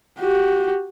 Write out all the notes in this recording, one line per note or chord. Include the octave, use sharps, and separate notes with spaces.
F#4 G4